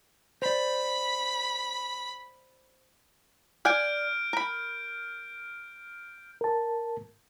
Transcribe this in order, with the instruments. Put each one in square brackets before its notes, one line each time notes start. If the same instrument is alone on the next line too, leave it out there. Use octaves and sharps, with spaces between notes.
[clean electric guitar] C5 D5 [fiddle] B5
[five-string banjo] D5 F#5 G#5 [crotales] F6 G6 D7
[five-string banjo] A#4 B5
[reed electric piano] A#4 A5